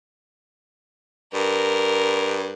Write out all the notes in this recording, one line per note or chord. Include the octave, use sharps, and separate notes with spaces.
G2 A#4